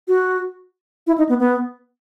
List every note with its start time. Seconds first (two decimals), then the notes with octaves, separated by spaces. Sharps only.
0.08 F#4
1.07 E4
1.18 D#4
1.29 B3
1.39 B3